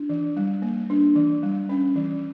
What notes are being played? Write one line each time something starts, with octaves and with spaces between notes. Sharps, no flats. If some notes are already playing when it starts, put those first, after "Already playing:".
Already playing: D4
E3
G3
A#3
D4
E3
G3
C#4
E3